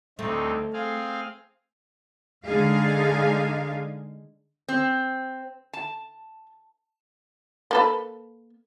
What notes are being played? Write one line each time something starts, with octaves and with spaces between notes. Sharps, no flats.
D2 A3 C4 D#4
C4 G#4 F5
D3 G#3 D#4 G#4 F5
C4
A5
A#3 A4 B4